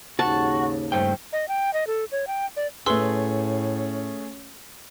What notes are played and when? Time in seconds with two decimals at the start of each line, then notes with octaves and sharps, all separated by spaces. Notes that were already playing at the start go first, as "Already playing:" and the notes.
0.19 D#2 G#2 C#3 F#4 A5 C#6
0.92 G2 A3 C5 G5
1.33 D#5
1.48 G5
1.73 D#5
1.87 A4
2.12 C#5
2.27 G5
2.57 D5
2.86 A2 A3 C#4 G#4 B4 C6 E6